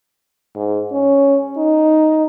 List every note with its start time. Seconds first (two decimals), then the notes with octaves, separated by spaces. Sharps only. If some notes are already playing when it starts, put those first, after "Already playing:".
0.56 G#2
0.92 C#4
1.57 D#4